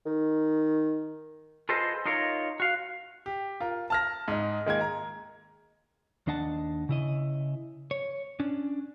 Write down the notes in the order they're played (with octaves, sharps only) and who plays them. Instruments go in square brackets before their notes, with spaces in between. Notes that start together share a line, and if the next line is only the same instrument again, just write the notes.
[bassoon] D#3
[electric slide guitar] F4 G#4 A4 B4 C5 D#5
D#4 F4 A#4 C#5
F#4 F5
[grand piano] G4
F4 A#4
A5 F6 A#6
G#2 D#4
D#3 G#3 A#3 G#6
A#5
[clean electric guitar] D#2 D4 D#5 F#5 A5
C#3 E4 D#5
C#5
C#4 D4